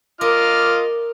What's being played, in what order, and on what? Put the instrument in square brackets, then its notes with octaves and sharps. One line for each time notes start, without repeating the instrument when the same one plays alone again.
[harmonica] F4 D#5 D6 [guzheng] A#4 [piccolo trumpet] F6